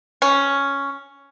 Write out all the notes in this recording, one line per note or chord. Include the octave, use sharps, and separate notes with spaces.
C#4